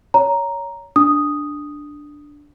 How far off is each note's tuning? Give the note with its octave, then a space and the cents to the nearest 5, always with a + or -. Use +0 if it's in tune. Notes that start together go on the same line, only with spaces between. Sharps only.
C#5 +15 A#5 +0
D4 +0 D#6 +0